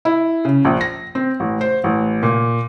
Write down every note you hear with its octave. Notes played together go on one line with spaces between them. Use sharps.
E4
C#3
A#1
A#6
C4
A1
C5
A1
A#2